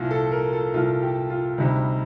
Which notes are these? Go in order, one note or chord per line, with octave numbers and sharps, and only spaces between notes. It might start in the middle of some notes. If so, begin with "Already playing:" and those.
Already playing: C2 A#2 F3
A4
A#4
A4
C2 A#2 F3 F4
G4
F4
D2 C3 G3 D#4